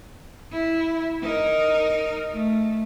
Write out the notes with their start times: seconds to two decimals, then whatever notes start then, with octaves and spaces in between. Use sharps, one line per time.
0.52 E4
1.22 D#4 A#4
2.33 A3